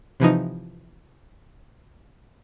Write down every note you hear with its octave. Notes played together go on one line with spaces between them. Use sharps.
C3 E3 F3 D#4